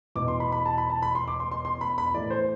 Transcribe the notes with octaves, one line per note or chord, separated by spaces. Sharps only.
E2 B2 D6
C6
B5
B5
A5
B5
A5
B5
C6
D6
C6
C6
C6
B5
B5
A2 E3 D5
C5